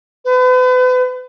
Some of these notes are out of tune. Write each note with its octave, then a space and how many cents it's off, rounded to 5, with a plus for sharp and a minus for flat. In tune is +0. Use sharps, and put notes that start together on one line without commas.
B4 +40